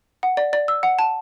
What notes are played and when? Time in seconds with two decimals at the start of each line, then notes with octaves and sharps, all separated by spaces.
0.23 F#5
0.37 D5
0.53 D5
0.68 E6
0.83 F#5
0.99 A5